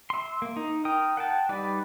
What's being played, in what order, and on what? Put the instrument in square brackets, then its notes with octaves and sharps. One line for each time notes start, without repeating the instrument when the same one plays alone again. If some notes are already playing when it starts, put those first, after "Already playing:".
[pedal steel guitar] E5 C6
A#3
D#4
A#4 G5 D#6
F#5 G5 A5
G3 D#4 B4 D5